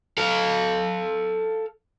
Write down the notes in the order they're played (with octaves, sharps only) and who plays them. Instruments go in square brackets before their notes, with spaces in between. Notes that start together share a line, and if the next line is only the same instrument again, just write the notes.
[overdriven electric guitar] A4 F5